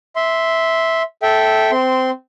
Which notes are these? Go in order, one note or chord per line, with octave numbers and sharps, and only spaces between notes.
E5 C6
A4 E5 G5
C4 C6